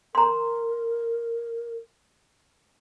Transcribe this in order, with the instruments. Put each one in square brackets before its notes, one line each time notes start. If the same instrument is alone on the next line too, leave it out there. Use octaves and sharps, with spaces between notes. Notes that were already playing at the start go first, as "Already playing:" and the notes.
[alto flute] A#4 [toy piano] A#5 C6